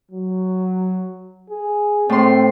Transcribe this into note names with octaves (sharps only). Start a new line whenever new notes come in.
F#3
G#4
A2 C4 C6